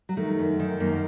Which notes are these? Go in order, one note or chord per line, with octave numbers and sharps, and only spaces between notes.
F#3
D#3 A3
F#2
D#3
F#2 A#3